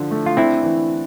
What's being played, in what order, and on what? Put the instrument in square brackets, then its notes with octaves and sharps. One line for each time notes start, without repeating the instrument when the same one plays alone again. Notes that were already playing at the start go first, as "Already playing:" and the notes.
Already playing: [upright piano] D3 F3 E4
A3
[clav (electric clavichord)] F4
[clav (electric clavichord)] C4 E4 [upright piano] D4
[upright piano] E3